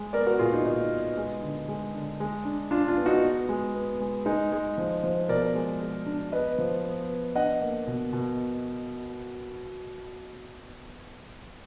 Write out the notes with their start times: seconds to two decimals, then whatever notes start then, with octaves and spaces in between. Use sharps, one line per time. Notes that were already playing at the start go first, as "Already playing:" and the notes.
Already playing: G#3
0.13 B3 A#4 D5
0.26 F#4 A#4
0.39 A#2 F4 G#4
0.53 D#4
0.65 A#2 D#4
0.91 B3
1.17 G#3
1.42 D3
1.68 G#3
1.95 D3
2.20 G#3
2.45 D4
2.71 D4 F4
2.88 D4 F4
2.97 B3
3.06 D#4 F#4
3.23 B3
3.49 G#3
3.75 B3
4.00 G#3
4.26 G#3 D#4
4.52 G#3
4.78 F3
5.04 F3
5.29 B2 A#4 D5
5.55 G#3
5.81 G#3
6.06 D4
6.32 B3 B4 D#5
6.58 F3
6.84 B3
7.09 B3
7.35 D4 D#5 F#5
7.61 A#3
7.87 B2
8.13 B2